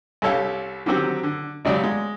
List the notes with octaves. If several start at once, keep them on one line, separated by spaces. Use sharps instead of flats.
C2 G4 A4 C#5 F5
D3 D#3 F#3 C4 F#4 G4
D3
G#1 C#3 F#3 G4 D5
G#3